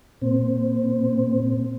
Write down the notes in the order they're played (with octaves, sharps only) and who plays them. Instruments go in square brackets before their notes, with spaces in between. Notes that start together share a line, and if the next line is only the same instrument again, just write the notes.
[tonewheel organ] A#2 C4